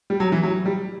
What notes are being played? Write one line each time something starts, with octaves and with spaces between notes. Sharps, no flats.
G3
F#3
E3
F#3
G3